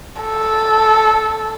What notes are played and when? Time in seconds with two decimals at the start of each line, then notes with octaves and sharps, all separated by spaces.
0.22 A4